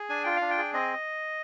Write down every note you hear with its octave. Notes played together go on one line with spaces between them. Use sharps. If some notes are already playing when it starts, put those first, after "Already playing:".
Already playing: G#4
D4 G#5
F4 G5
F5
D4
G5
G#4
C4 D#5